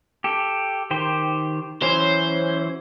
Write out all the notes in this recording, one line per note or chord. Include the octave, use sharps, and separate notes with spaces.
G4 A4
D#3 G4 C5
E3 F#3 C#4 C5